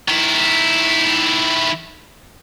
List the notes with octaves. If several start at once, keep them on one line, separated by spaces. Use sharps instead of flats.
D#3 E4